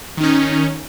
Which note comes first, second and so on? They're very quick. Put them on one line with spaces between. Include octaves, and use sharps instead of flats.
D#3 D#4 C#4